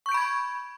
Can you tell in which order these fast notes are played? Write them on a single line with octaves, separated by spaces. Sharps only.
C#6 G6 D7 B5 G#6